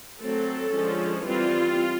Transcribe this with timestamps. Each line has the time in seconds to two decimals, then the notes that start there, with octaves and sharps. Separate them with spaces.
0.19 F#3 A3 C4 A4
0.72 D3 F3 G#3 C#4
1.25 E3 G3 C4 F4